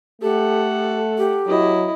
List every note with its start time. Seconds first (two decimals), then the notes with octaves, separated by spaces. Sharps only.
0.22 A3 G4 A4 F#5
1.18 G4
1.47 F#3 E4 D#5